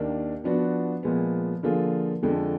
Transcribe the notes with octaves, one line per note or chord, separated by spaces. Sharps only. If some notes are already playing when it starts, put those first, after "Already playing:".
Already playing: D#2 D#3 A#3 D4
F3 B3 D4 F#4
A#2 F3 G#3 B3
D3 F3 A#3 F4 G#4
F2 D3 F3 G#3